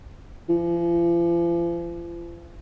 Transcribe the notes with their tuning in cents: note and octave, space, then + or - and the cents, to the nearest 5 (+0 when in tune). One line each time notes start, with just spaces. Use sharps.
F3 -40